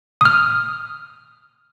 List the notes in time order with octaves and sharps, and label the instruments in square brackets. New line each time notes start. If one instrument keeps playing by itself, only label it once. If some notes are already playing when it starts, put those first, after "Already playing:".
[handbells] D#6 F6